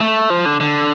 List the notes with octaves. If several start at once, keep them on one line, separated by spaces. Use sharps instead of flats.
A3
F3
D3
D3